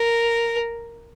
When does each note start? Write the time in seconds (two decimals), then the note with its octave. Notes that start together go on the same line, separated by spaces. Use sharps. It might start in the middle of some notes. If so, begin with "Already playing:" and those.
Already playing: A#4